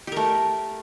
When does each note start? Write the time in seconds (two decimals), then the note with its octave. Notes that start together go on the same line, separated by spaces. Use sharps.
0.07 G4
0.12 A#4
0.17 A3